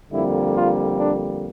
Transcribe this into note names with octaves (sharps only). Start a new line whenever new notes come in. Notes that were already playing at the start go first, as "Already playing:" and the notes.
F2 D3 G3 A#3 E4
F4
D4